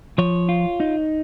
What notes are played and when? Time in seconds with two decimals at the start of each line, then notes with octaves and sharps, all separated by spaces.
0.18 F3 C#5
0.49 F4
0.80 D#4